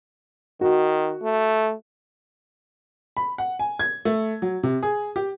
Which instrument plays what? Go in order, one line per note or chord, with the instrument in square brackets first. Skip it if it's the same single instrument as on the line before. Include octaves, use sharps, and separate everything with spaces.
[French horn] D#3 [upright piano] F#4
[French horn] A3
[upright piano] B5
F#5
G#5
G#6
A3
F#3
C3
G#4
G4